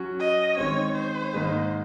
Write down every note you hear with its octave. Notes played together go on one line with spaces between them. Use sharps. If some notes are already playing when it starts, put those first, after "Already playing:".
Already playing: F#3 C#4 F#4
D#5
D#3 G#3 C4 C#5
C5
G#2 D#3 A#3 D#4 G#4